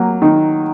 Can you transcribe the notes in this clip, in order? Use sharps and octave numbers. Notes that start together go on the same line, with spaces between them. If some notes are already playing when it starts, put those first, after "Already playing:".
Already playing: F#3 A#3
D#3